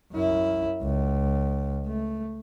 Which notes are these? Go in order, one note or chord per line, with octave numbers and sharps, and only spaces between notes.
F#2 E4
C#2
A3